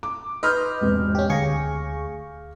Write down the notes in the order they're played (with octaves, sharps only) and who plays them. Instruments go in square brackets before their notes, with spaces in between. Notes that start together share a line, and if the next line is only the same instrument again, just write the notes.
[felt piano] D6
[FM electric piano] D#4 B4 D#5 [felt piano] C6 F6 G6
[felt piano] E1 G#2 C3
[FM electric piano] C#4 G4
[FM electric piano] D2 G#4 C#6 [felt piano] F5 A#6